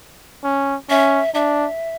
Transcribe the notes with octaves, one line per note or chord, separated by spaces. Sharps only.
C#4
C#4 E5
D4 E5